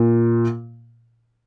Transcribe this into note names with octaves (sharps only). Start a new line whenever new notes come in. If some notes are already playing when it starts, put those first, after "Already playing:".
Already playing: A#2